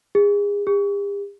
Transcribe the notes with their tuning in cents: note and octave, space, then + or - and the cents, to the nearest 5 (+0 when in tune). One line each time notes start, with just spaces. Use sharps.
G#4 -30
G4 +45